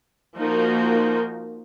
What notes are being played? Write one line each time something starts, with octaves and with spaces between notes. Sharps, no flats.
F3 A#3 D#4 F#4 A#4